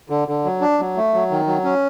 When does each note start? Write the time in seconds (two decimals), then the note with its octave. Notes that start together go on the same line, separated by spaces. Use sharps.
0.10 D3
0.28 D3
0.45 F#3
0.61 D4
0.79 F#3
0.97 A3
1.14 F#3
1.31 D#3
1.47 F#3
1.64 C#4